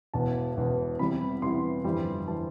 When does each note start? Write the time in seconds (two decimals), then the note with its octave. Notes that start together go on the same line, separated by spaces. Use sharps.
0.14 E1 E2 B2 A5
0.56 E1 E2 B2
0.99 E2 C3 E3 G3 B5
1.42 E2 C3 E3 G3 C6
1.84 G1 F2 E3 G3
2.28 E3 G3 A5